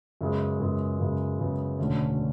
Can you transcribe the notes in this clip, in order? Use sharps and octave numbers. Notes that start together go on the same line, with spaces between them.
F#2 C#3 G#3 B3
F#2 C#3 G#3 B3
F#2 C#3 G#3 B3
F#2 C#3 G#3 B3
E1 D2 D3 A3 C#4